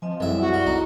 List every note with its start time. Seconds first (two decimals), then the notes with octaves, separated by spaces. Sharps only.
0.02 F3 C4 D#5 G#5
0.20 C2 F#2 E4 G#4 A4 E5
0.41 F#4
0.54 G3
0.66 C#2 D#4